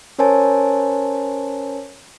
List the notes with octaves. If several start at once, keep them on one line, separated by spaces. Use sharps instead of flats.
C#4 A#4 C5 C#5 G#5 A5